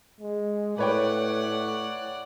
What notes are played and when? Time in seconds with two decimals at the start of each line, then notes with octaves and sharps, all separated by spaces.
0.20 G#3
0.78 A2 B4 C#5 D5 F#5 G5